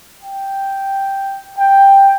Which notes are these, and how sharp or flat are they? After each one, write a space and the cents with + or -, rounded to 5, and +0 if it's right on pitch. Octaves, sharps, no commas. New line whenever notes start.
G5 +0
G5 +5